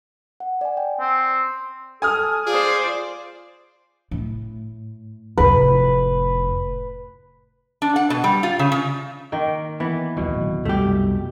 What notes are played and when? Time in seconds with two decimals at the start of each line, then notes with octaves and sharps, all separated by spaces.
0.40 F#5
0.61 D5 G#5
0.77 G5
1.00 C4
2.02 A4 G#5 D#6 F6
2.47 F4 G#4 C5 D5
4.11 A2
5.38 F1 A2 B4
7.82 D4
7.96 F#5
8.10 B2
8.24 G3
8.43 F4
8.59 C#3
8.72 C#3
9.32 D#3 A#3 G5
9.80 E3 B3
10.17 D1 A#1 B2 D#3
10.65 C2 F#2 A3 G4